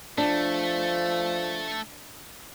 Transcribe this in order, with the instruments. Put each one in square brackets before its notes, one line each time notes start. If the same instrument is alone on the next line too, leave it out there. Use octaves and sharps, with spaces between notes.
[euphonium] F3 [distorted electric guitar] A3 [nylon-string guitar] D4